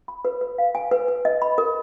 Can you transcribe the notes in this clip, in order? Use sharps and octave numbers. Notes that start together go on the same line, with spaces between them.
B5
B4
B4
F5
G#5
B4
B4
D#5
B5
A#4